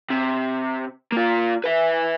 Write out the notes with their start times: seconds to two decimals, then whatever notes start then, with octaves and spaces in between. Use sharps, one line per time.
0.11 C3
1.12 A#3 F4
1.64 B4 E5